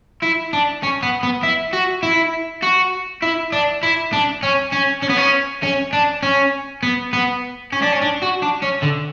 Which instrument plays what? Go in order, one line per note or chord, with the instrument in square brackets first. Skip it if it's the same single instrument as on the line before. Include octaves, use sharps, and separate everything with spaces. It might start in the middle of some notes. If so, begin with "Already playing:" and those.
[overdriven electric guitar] E4
D4
C#4
B3
B3
E4
F#4
E4
F#4
E4
D4
E4
D4
C#4
C#4
C#4
B3
C#4
C#4
D4
C#4
B3
B3
C#4
D4
C#4
D4
F#4
D4
C#4
D3